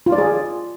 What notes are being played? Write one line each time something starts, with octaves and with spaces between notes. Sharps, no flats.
F4
D5
G#4